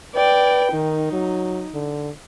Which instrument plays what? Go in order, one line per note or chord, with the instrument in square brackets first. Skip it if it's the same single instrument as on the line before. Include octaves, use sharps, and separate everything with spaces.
[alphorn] B4 [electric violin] D5 G5
[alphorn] D#3 [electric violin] D#4
[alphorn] F#3
D3